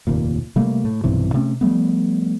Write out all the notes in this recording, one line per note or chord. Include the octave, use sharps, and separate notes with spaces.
F1 D#2 A#2
C3 G3 A3 A#3
A2
B1 G2 C3 E3
C3 A3 C#4
F3 G3 A3 B3